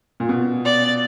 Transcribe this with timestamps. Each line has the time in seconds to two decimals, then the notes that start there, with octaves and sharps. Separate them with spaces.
0.20 A#2
0.29 B2
0.65 D5